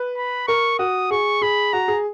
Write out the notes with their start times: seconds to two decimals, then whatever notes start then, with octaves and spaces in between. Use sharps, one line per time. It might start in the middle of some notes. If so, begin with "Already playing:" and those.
Already playing: B4
0.17 B5
0.47 A#4 C#6
0.79 F#4 D#6
1.11 G#4 C#6
1.42 G#4 B5
1.73 F#4 A#5
1.88 G#4